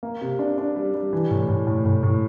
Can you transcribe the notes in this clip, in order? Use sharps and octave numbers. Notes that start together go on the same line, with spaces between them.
A#3
C3
D4
D4
G3
G3
E3
A2
A2
A2
A2
A2